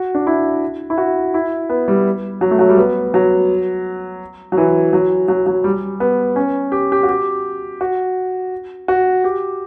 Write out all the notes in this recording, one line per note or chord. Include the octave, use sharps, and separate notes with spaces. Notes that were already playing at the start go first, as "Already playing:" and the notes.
Already playing: F#4
D4
E4
E4
F#4
E4
B3
G3
F#3
A3
F#3
G3
B3
F#3
F#3
E3
F#3
F#3
F#3
G3
B3
C#4
G4
G4
F#4
G4
F#4
F#4
G4